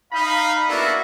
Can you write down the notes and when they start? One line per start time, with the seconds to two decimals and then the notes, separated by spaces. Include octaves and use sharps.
0.13 D#4 F5 B5
0.68 A#3 B3 D4 E4 F#4 A4